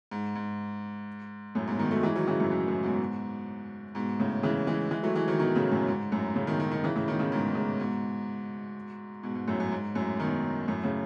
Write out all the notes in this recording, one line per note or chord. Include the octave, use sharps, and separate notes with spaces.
G#2
G#2
F#2 A2
G#2 B2
B2 D#3
F#3 A3
E3 G#3
D#3 F#3
C#3 E3
F#2 A2
F#2
F#2 A2
G#2 B2
G#2 B2
A2 C#3
C#3 E3
E3 G#3
E3 G#3
F#3 A3
E3 G#3
D#3 F#3
B2 D#3
A2 C#3
F#2 A2
G#2
F#2 A2
A2 C#3
B2 D#3
B2 D#3
B2 D#3
C#3 E3
A2 C#3
B2 D#3
A2 C#3
G#2 B2
A2 C#3
G#2 B2
G#2 B2
G#2
F#2 A2
F#2
G#2
F#2 A2
B2 D#3
F#2 A2
A2 C#3